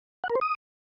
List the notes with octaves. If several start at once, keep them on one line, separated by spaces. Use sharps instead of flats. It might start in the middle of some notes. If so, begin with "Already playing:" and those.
F#5
A#4
C5
D#6